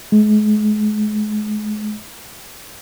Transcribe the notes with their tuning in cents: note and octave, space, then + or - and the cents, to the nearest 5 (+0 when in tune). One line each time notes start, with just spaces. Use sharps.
G#3 +35